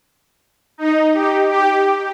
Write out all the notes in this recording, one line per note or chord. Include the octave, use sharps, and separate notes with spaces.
D#4
G4
G4